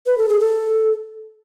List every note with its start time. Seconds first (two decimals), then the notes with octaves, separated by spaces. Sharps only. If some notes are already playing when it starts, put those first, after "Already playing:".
0.06 B4
0.18 A4
0.29 G#4
0.40 A4